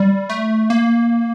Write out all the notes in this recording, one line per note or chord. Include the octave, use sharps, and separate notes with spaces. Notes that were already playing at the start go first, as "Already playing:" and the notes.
Already playing: G3
A3
A#3